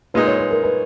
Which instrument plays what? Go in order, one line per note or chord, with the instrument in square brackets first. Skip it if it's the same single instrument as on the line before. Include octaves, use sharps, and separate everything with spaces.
[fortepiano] A#2 G#3 D#4 [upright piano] B4
[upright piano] C#5
B4
A#4
B4